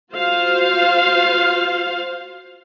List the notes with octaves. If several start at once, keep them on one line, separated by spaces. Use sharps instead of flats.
F4 F#4 C5 F5